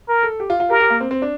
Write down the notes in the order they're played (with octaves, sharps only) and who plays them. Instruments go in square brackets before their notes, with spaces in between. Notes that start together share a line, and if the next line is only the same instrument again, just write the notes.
[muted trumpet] A#4
[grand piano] A4
G4
F4
F4
[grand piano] G4 [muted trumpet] A#4
[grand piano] G4
A#3
C4
C4
D4